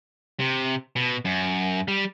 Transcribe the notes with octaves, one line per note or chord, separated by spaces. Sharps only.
C3
B2
F#2
G3